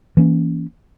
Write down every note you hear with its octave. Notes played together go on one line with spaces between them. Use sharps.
E3 A#3 C#4